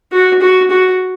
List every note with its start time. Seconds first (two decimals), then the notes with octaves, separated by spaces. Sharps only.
0.13 F#4
0.42 F#4
0.71 F#4